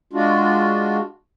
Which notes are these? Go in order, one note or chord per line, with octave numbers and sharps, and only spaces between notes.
G#3 D4 F4 F#4